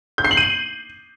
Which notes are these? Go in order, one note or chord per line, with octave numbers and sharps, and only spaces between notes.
G6
C7
F#7
D#7